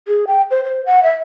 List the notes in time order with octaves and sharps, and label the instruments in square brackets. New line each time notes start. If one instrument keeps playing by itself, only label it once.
[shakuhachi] G#4
G5
C5
C5
F#5
E5